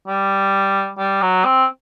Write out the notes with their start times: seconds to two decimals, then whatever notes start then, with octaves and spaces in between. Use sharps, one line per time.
0.08 G3
0.98 G3
1.22 F#3
1.45 C4